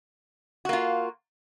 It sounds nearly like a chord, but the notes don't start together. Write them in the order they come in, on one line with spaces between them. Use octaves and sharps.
F#4 A#3 F4